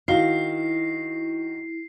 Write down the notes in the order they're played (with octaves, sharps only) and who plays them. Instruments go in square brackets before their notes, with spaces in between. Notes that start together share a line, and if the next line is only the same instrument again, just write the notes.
[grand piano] D#3 F#4 G7 [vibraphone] E4 [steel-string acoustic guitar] F5 [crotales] C7